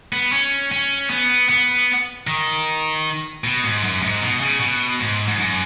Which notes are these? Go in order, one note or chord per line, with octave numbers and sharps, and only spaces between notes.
B3
C#4
C#4
B3
B3
D#3
B2
G#2
F#2
G#2
B2
C#3
B2
G#2
G#2
F#2